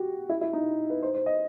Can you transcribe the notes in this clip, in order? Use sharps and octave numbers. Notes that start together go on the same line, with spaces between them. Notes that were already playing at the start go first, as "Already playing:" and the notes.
Already playing: F#4 G4
E4
E4
D#4
B4
C5
C5
D#5